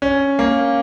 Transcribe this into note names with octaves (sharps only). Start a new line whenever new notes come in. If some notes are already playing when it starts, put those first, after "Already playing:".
C#4
A#3